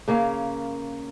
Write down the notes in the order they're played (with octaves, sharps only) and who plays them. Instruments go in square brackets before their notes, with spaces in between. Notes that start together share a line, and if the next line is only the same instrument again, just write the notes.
[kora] C#3 A#3 C#4 F5